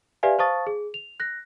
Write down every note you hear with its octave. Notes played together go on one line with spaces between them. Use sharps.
G4 B4 D5 E5 F5 G#5
C5 F5 A5 C#6 D#6 A6
G#4
F7
F#6 A#6